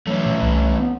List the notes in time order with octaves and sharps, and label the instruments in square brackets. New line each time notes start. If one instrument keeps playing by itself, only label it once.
[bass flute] E3 [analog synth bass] F#3 [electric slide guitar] A3 C#4
[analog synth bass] A#2
C2
B3